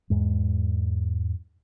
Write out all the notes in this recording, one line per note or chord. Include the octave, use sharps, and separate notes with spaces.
E2 G#2 G#3